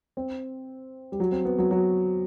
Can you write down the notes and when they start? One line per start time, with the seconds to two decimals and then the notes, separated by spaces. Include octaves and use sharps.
0.17 C4
1.12 G3
1.20 F#3
1.32 C4
1.45 B3
1.58 F#3
1.71 F#3